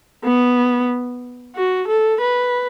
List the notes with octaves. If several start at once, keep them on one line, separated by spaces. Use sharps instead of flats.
B3
F#4
A4
B4